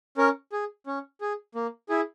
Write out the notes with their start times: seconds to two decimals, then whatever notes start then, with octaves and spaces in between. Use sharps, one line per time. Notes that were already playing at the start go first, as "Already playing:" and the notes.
0.17 C#4 A#4
0.52 G#4
0.87 C#4
1.21 G#4
1.55 A#3
1.89 E4 G#4